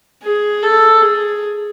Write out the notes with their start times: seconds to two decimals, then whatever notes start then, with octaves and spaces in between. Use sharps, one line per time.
0.23 G#4
0.63 A4
1.02 G#4